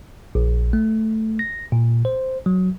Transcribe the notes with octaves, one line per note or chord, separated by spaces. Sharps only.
A#1
A3
A#6
A#2
C5
F#3